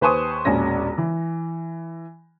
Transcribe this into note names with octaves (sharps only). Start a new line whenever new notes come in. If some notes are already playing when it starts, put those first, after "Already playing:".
D#2 B4 C5 G#5 C#6 D#6
E1 A#1 C#4 C#5 A#6
E3